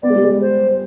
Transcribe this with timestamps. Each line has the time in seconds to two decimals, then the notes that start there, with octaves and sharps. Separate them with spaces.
0.03 B3 D5
0.10 G#3
0.16 G3
0.24 G#3
0.41 C5